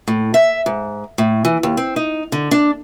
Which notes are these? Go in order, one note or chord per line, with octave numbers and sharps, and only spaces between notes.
A2
E5
G#2
A2
E3
D#2
C4
D#4
D3
D4